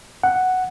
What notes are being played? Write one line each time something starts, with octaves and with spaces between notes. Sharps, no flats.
F#5